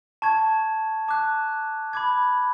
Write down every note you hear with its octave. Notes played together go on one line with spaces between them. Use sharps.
A5 C#6 G#6
A5 D6 F#6
B5 D6 G#6